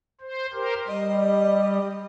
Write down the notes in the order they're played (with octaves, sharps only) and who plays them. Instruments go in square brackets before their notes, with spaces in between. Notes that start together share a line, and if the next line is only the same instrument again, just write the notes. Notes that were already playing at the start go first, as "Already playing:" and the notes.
[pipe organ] C5
G4 A#4 C5
[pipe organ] G3 [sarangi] D#5